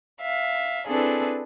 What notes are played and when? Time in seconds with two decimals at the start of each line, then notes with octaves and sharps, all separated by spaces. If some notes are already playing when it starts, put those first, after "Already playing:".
0.21 E5 F5
0.86 C4 D4 E4 G#4 A4 B4